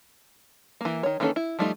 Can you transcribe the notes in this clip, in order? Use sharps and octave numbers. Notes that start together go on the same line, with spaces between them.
E3 A#3
D#3 C#5
D#3 E3 A#3 C#4 A4
E4
F3 G3 A3 D#4 F4